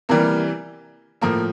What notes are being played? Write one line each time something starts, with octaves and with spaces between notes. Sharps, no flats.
C3 E3 G3 A#3 A#4
A2 F3 A#3 A#4